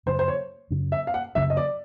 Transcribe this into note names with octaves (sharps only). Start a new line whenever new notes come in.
F#2 C#3 F#3 C5
C5
C#5
F#2 C#3 F#3
E5
F5
F#5
F#2 C#3 F#3 E5
D#5
D5